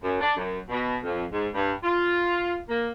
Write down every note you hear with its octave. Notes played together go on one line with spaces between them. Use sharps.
F#2
D4
F#2
B2
F2
G#2
G2
F4
A#3